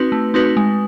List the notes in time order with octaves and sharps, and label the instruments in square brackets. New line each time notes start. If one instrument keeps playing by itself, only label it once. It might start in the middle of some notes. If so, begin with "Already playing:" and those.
Already playing: [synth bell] C4 D#4 F#4 B4
A3
C4 D#4 F#4 B4
G#3